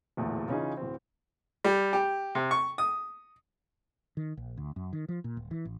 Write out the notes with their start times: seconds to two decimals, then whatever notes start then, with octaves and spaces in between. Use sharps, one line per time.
0.17 D1 E2 A#2 A3
0.48 C#3 E3 C#4 D#4 F4 G#4
0.77 D1 C4
1.64 G3
1.93 G4
2.35 C3
2.51 C#6
2.78 D#6
4.17 D#3
4.37 A#1
4.57 D2
4.76 F#2
4.93 D#3
5.09 F3
5.24 A#2
5.37 D1
5.51 E3
5.65 A1